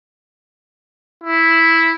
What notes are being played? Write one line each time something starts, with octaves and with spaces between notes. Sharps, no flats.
E4